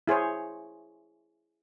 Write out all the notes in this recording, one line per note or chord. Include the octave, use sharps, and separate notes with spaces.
E4 G#4 C5 C#5